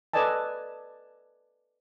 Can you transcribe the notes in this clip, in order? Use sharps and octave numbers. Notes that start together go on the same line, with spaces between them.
A4 B4 D5 D#5 G#5 A5